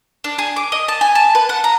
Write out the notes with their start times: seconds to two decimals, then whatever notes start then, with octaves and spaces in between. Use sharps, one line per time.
0.24 D4
0.38 G#4
0.56 D6
0.72 D#5
0.88 A5
1.01 G#5
1.15 A5
1.35 B4
1.49 F#5
1.64 A#5